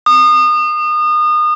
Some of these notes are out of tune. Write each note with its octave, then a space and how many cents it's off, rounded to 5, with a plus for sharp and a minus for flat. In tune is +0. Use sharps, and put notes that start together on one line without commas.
D#6 -30